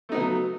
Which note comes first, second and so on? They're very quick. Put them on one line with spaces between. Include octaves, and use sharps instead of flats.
A3 D#4 B3 C#3 F#3